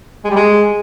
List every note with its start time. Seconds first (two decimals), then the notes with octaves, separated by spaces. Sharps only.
0.25 G#3
0.30 G3
0.36 G#3